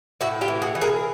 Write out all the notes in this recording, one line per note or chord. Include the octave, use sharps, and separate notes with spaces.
A2 E4 F#4
F4 G4
E3
F#4 G#4
E3
G#4 A#4